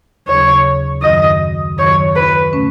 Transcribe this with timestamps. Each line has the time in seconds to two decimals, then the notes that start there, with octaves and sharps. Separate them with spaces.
0.27 D#2 C#3 F#3 C#4 G#4 C#5
1.03 F#2 D#3 F#3 D#5
1.77 F#2 D#3 F#3 C#5
2.16 B4
2.53 B2 A3 C#4